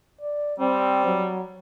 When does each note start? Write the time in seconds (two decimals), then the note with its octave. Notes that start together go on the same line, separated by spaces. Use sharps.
0.21 D5
0.59 G3 C4
1.06 F#3